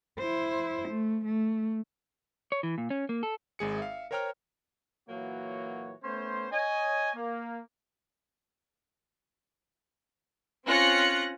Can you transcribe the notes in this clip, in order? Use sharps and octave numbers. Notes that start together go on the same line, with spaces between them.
E4 C5
A3
A3
C#5
E3
A#2
C#4
A#3
A4
G#1 G#3 G#4 C#7
E5 F5
A#4 C5 C#5 G5 A#5 F6
A#2 E3 F#3 A#3 F#4 C#5
A3 B3 C#4 C5
C#5 D#5 G#5
A#3
C4 C#4 F4 F#6 A#6 C#7